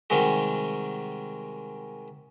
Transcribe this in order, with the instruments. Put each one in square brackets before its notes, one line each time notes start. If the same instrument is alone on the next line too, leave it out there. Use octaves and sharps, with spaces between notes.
[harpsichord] C3 D#3 G3 G#3 F#4